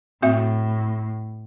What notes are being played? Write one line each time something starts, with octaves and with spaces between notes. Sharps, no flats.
A2 C4 F#4 E5